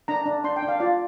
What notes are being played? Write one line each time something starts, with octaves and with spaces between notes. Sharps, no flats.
D4 A#5
D4
D4 C6
G5
D4
F5
F4 D5